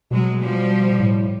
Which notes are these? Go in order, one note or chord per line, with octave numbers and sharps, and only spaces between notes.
B2 F#3 G#3
F3 G3
A2